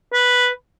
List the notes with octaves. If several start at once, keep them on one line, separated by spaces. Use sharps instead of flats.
B4